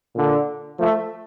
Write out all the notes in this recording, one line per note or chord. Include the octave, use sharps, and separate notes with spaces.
A#2 D3
F3 A3